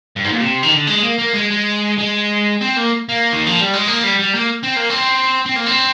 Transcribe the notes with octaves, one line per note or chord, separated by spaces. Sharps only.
G2
G#2
A#2
C3
D#3
D3
G#3
A#3
A#3
G#3
G#3
G#3
C4
A#3
A#3
D#3
F3
G3
G#3
A#3
G3
G3
A#3
C4
A#3
C4
C4
A#3
C4